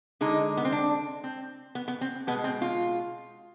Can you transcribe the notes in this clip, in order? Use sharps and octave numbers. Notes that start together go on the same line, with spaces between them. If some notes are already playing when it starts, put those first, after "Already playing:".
D3 G#3 D#4
B3
C4
D4
C4
B3
B3
C4
B2 G#3 B3
C4
F4